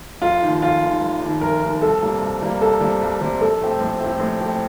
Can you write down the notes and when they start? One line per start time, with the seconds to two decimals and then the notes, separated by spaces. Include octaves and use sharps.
0.22 F1 F4
0.42 D#2 D#3
0.62 F1 F4
0.82 D#2 D#3
1.01 F1
1.22 D#2 D#3
1.41 F1 A#4
1.62 D#2 D#3
1.81 C2 A4
2.02 C3 G3 A#3
2.22 C2
2.41 C3 G3 A#3
2.61 C2 A4
2.80 C3 G3 A#3
3.02 C2
3.20 C3 G3 A#3
3.40 A#1 A4
3.61 A2 A3 C4 G4
3.81 A#1
4.00 A2 A3 C4 G4
4.20 A#1
4.40 A2 A3 C4 G4